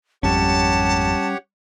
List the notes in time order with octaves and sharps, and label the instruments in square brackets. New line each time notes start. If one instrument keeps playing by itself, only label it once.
[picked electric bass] G#1 F2 [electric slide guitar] G3 C#4 [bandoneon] G4 C#5 F#5 [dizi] A5